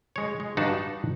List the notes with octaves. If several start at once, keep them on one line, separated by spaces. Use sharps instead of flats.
G#3 C#5
G#3
G2 D4 D#4 F#4 F#5 A5